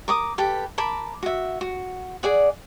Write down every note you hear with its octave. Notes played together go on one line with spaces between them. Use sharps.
A#4 D6 D#6
G4 A4 B4
A#4 A5 B5 D6
F#4 E5
F#4
G#4 D5 F#5